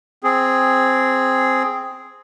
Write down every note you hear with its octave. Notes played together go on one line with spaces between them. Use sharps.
C4 G#4